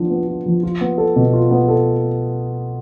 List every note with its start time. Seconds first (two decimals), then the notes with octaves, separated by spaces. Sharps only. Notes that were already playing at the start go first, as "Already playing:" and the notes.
Already playing: F3 B3 D4 F4
0.10 B3
0.28 F4
0.46 F3
0.63 F4
0.81 B3
0.98 A4
1.16 B2
1.33 F4
1.51 B3
1.68 A4